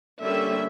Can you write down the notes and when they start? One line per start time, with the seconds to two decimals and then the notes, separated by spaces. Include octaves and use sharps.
0.22 D3 G3 A#3 C#4 E5